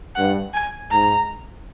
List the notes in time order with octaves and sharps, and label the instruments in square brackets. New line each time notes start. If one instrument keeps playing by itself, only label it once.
[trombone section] G2 [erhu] F#5
[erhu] G#5
[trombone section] G#2 [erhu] A#5